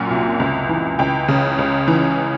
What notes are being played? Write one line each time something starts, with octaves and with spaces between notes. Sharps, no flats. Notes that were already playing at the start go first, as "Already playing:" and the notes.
Already playing: F#2 A#2 F#5
C2
C#2
E3
C#2 G5
C#3
C#2
E3